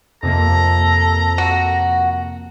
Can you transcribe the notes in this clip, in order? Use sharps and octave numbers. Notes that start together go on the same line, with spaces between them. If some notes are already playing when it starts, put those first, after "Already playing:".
F2 C3 A#3 A4 A#5
F#4